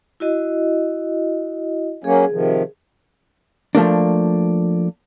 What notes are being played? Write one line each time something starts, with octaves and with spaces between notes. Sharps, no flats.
E4 F#4 D#5
F#3 A#3 C#4 G#4
C3 D#3 F3
F3 A3 A#3 D4